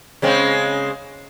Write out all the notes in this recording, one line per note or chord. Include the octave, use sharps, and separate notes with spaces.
C#3 G#3 C4